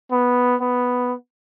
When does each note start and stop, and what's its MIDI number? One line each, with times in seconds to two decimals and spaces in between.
0.12 0.56 59
0.61 1.15 59